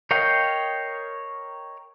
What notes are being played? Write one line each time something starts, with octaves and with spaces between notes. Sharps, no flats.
A#4 C#5 D#5 F5 G5